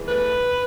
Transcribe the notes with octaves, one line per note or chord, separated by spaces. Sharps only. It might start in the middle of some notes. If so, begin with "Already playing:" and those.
Already playing: E2
A3 B4